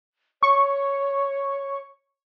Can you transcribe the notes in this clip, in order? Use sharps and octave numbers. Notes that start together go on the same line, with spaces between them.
C#5 C#6